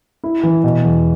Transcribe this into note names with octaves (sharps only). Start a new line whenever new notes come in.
E4
E3
B2
E2